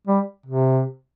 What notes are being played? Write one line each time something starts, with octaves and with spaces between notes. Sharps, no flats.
G3
C3